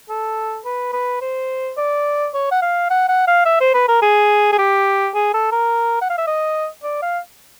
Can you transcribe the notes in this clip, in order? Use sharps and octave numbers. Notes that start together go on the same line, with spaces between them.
A4
B4
B4
C5
D5
C#5
F#5
F5
F#5
F#5
F5
E5
C5
B4
A#4
G#4
G#4
G4
G#4
A4
A#4
F#5
F5
E5
D#5
D5
F5